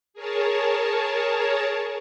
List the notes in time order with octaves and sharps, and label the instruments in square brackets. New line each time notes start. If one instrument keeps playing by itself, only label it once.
[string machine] G#4 A#4 C#5 A5